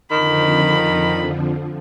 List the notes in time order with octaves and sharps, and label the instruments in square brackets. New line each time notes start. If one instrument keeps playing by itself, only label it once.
[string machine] F2 D3 F3 [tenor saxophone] D#3 [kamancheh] B5